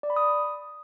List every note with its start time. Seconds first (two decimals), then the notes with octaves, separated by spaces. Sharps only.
0.03 D5
0.10 B5
0.16 D#6